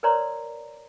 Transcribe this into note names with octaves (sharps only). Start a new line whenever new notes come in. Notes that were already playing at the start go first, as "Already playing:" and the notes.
A#4 B4 C#5 D5 A#5 C6